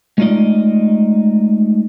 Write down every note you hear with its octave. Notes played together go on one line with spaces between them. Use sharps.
G#3 A3 D#4 F4 D5 D#5